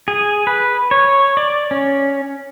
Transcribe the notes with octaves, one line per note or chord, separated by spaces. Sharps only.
G#4
B4
C#5
D5
C#4